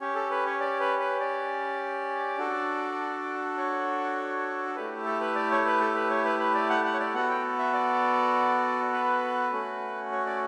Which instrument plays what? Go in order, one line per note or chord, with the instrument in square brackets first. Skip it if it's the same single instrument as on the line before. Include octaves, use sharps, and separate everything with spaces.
[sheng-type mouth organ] C#4 G4 C#5
A4
B4
C#5
D5
B4
B4
D5
D4 F#4 A4
C#5
A3 E4 G4 B4
A4
B4
D5
C#5
B4
A4
B4
C#5
B4
B4
D5
F#5
F#5
C#5
D5
B3 F#4 A4 F#5
G5
E5
D5
B4
A3 C#4 F#4
C#5
D5